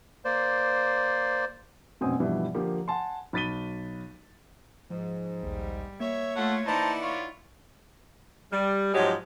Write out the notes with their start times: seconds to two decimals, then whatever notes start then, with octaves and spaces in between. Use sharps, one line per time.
0.25 A#3 C5 D5
2.01 F1 F#2 B2 C4 G#5 D#6
2.20 G2 B2 E3 F3 G3
2.54 D3 F3 A#3 G4
2.88 F#5 G#5 A5 C6
3.33 B1 B5 A6 B6 D#7 G7
4.91 G#2 F3
5.43 A#1 D#2 G3
6.00 A#3 C#5 E5
6.36 A3 F4 A4 F#5
6.67 E3 D#4 E4 C5 D5 F#5 A5 A#5
7.02 F4 C#5
8.52 G3
8.94 G#2 F3 F#3 G#3 G4